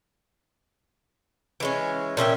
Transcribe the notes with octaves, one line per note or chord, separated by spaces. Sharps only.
E3 G#3 C#4
A#2 C#4 E5 G5